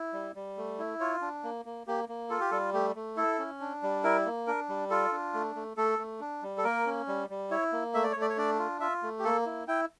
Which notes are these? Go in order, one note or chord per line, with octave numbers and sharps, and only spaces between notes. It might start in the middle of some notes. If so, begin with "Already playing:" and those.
Already playing: E4
G3
G3
A3
E4
F4 C#5
D4
A#3
A#3
A#3 G4
A#3
F4 A4
G4
G3 A4
A3 G4
A3
E4 A4
C#4
D4
G3
E4 A#4
A#3
D4 A#4
G3
F4 A4
D4
A3
A3
A3 A4
A3
D4
G3
A4
A#3 A#4
C#4
G3
G3
E4 C#5
A#3
A3 E5
D5
C#5
A3 D5
C#5
D4 D5
F4
F4 E5
A3
G4
A#3 A4
E4
E4 G5